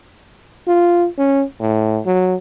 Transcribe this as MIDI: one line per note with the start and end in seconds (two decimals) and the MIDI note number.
0.67 1.08 65
1.18 1.44 61
1.60 2.01 45
2.06 2.35 54